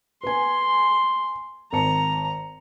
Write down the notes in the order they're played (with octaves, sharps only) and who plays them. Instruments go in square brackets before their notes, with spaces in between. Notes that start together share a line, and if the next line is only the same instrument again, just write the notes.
[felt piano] B4 G#5 [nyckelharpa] C6
[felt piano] G#1 A5 C#7 [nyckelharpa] A#5